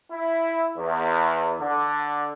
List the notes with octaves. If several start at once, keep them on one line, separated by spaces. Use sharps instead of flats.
E4
E2
D3